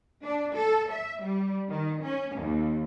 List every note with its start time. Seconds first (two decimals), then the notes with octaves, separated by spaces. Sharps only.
0.23 D4
0.53 A4
0.91 E5
1.21 G3
1.69 D#3
2.03 C#4
2.36 D#2